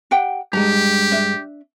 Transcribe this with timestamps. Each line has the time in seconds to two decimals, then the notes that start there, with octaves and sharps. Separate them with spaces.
0.11 G4 F#5 G5
0.53 G2 G#3 G4 A#5
1.12 D4 E5